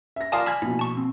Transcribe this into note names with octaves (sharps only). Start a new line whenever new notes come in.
E5 A#6
A#3 F4 A#4 D5 G#5 A5 D#6
G#5 A5 B5 F6 G#6
A#1 B2 E4
A5 C#6
C4